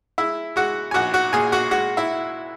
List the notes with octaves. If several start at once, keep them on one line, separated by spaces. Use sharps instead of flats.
G#3 E4 E5
G#3 F#4 F#5
G#5
A#1 F#4 F#5
F#4 F#5
A#2 G#4 G#5
F#4 F#5
G#3 F#4 F#5
E4 E5